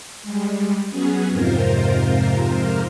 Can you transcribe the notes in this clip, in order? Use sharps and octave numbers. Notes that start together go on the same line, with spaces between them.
G3 G#3
F#3 B3 C#4 G#4
F2 G#2 C3 F4 A#4 C5